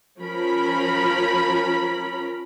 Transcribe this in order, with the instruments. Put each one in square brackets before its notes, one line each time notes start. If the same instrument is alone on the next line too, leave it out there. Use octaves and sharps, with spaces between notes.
[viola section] F3 C#4 A#4 B5